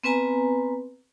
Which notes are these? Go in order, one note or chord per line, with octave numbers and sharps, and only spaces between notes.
B3 C4 B4 G#5 A#5